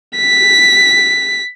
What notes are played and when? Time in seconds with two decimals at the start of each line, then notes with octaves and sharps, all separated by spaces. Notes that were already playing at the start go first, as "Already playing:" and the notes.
0.17 B6